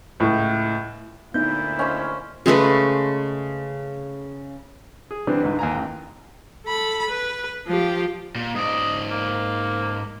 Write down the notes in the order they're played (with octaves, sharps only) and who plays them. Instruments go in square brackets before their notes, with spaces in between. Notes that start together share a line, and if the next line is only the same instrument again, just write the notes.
[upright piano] C#2 A2
[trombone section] D2 A#2 E4 [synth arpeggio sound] B3 D#4 [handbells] G6
[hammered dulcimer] C#4 C5 [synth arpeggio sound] D#5 F5 F6
[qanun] C#3 G#3 A3 B4
[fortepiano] G#4
D3 E3 G3 B3 C4 D4
C2 G#2 D3 D#4 B4
D#2 G#5 A#5
A1 G5
[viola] A4 B5
B4
F3 G4
[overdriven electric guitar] A#2
[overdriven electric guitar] G#2 D5 [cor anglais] D#5
[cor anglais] A#3